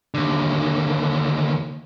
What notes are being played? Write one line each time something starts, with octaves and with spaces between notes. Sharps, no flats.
D#2 D3